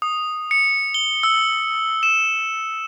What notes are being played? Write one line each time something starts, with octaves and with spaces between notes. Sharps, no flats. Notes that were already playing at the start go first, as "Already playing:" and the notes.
D#6
C#7
G7
E6
E7